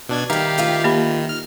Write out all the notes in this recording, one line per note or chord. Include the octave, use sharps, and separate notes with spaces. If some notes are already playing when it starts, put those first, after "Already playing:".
B2 D4 G#6
D#3 G3 G4 E5 F5 A#5
D2 F4 E5
D#3 A#3 G4 B5
F6